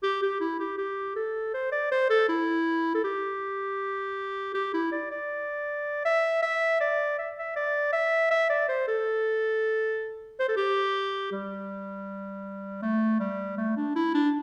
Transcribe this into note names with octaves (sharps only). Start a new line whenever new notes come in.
G4
G4
E4
G4
G4
A4
C5
D5
C5
A4
E4
A4
G4
G4
E4
D5
D5
E5
E5
D5
E5
E5
D5
E5
E5
D5
C5
A4
C5
A4
G4
G3
A3
G3
A3
D4
E4
D4